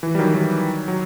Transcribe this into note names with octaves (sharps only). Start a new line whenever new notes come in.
E3
G3
D#3 F#3
D#3 F#3
F#3